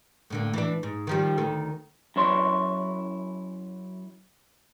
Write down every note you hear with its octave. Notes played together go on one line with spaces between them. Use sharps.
A2 D3 A#3
E3 D4
G#2
D#3 F3 G3
D2 D#3 A4
F#2 E4 C#5 C6